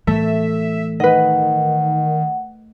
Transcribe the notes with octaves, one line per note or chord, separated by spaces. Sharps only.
A2 E3 A3 E5
D#3 B4 D#5 F#5